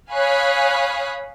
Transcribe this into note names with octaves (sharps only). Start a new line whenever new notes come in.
C#5 F5 G#5 B5 D#6 F#6